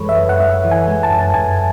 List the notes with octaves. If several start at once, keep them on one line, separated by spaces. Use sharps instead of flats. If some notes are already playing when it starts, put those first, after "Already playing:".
Already playing: F#2 E3 G#3 A4 B4 C#5
E5
F#2
F#5
F#2 E5
E3
G#5
G#3
A5
F#2
F#2 G#5